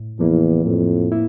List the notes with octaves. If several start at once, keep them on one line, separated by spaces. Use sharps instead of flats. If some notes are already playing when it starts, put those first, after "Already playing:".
Already playing: A2
E2 F3 A#3 E4
F2 A2
A#3 E4